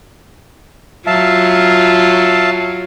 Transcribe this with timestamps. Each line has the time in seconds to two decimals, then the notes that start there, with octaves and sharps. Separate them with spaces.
1.07 F#3 F4 E5 F5 A5